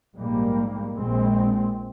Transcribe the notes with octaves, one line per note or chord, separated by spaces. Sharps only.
A#1 G#2 G3 A#3
A#1 A#2 G#3 C4